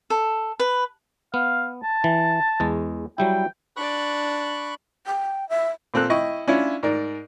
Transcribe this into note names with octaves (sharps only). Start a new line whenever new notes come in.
A4
B4
B3 F5
A5
E3
E2 G#3
F#3 G3 E4 G5
D4 D5 B5 C#6 F#6
G5
E5
A#2 C4 A4 F#6
E4 D#5 G5 C#6
C#4 D4 E4 F4 C#5
G#2 A#4 D5